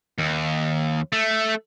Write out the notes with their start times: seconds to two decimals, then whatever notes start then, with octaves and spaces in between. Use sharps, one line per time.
0.18 D#2
1.12 A3